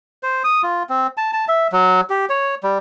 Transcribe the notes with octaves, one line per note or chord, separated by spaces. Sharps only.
C5
D#6
F4
C4
A5
A5
E5
F#3
G4
C#5
G3